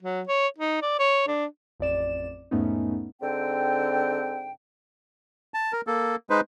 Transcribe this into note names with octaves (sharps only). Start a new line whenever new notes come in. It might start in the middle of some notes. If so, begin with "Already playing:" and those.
F#3
C#5
D#4
D5
C#5
D4
A1 F2 D5 E7
E2 G#2 A3 B3 C#4 D#4
G#2 D3 C4 G5
A5
A#4
A#3 A4
G#3 D#4 B4 C5